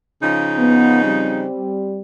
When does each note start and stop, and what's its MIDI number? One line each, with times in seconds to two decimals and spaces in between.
0.22 1.44 49
0.22 1.44 53
0.22 1.44 63
0.59 1.03 59
1.04 2.01 55
1.04 2.01 60